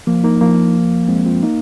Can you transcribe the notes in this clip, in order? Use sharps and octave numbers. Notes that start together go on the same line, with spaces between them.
F3 A#3
A#3 D#4
F3 A#3
G#3 C4
C4 F4
A#3 D#4